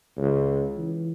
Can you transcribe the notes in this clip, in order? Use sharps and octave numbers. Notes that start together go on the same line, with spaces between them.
C#2
E3